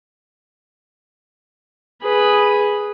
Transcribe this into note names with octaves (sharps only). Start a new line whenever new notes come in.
G#4 B4